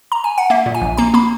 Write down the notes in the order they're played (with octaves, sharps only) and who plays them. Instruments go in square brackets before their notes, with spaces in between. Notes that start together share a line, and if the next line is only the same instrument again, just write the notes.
[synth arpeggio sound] A#5
G#5
F#5
A#3 E5
A#2
G#5
A#1
A#3 A#5
A#3 B5